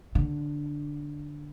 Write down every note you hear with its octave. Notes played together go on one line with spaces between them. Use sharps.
D3